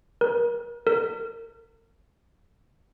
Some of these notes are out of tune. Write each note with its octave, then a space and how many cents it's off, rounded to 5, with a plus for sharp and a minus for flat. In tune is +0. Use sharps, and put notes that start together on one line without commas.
A#4 +35
A#4 -40